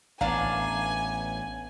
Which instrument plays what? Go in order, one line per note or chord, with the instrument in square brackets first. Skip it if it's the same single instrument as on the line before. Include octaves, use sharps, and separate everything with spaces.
[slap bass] A1 [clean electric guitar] B3 A#5 [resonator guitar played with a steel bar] D4 D5 F5 [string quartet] G#5